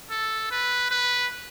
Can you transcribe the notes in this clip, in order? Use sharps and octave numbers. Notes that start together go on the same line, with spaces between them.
A4
B4
B4